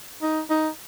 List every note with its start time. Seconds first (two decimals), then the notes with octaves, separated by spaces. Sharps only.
0.22 D#4
0.50 D#4